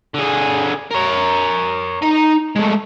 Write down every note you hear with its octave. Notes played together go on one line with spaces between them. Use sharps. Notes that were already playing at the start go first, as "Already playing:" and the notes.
D3 G#4
A#4 C#5
D#4 A#5
G#3 A3